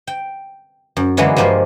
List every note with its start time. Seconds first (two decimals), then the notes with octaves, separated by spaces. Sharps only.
0.07 G5
0.97 F#2
1.17 D3 E3 F#3 G#3 A#3 B3
1.37 G2 F3 G#3 A#3 C5